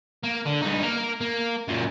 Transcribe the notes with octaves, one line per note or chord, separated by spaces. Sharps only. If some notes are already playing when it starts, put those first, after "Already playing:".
A#3
D3
G2 D#4
A#3 A#4
A#3
F#2 A#2